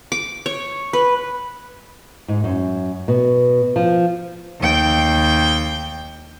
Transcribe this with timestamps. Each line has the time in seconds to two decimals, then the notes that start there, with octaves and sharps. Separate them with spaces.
0.12 D6
0.46 C#5
0.93 B4
2.28 G#2
2.44 F#2
3.08 B2
3.76 F3
4.61 D#2 G5